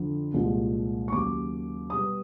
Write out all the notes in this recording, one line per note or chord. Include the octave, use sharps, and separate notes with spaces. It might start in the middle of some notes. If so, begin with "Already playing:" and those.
Already playing: F2 D3 F3
C2 A#2 F3 G#3
C#6
D#2 C#3 F#3 D6
B2 G3 B3 D#6